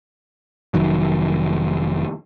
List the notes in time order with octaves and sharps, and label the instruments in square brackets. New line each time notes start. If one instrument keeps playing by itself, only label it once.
[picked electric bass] F1 D#3 F#3